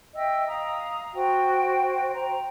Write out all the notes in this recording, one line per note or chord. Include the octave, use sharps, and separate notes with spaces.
D#5 E5 G5 E6
F5 A#5 D#6
F#4 C5 G5
C5 G5 A#5